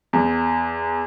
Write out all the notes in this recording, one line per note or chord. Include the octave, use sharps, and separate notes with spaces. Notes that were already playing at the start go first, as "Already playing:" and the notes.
E2